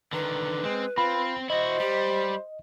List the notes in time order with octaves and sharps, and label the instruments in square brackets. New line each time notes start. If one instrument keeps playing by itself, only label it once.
[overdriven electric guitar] D3 D#3 [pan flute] B4
[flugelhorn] G#3 [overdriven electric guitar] C4
[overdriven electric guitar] C4 [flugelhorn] F4 [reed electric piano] B5
[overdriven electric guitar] E4 F#4 [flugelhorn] C5 [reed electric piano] D#5
[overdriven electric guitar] G3 [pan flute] G4